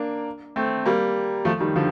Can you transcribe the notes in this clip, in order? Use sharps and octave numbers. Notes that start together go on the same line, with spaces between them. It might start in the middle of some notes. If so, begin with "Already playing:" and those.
Already playing: A#3 D4
A3 C4
G3 A#3
F3 A3
D#3 G3
D3 F3